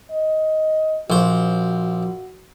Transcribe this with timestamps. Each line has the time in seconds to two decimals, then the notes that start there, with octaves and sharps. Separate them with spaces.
0.11 D#5
1.10 A#1 F#4 C5